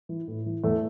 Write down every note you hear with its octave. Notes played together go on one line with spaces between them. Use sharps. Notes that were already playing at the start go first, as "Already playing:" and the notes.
E3
A2
E3
E2 A3